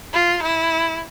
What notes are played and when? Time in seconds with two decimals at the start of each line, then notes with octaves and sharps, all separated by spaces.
0.13 F4
0.43 E4